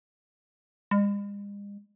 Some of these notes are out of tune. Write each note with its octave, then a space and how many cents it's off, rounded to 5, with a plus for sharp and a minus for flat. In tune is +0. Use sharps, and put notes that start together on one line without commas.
G#3 -45